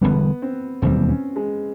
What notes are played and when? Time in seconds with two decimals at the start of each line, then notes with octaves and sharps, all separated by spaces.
0.01 E1 D#2 D3 G3 B3
0.42 C4
0.82 E1 D#2 D3 G3 C4
1.09 C#4
1.36 G#3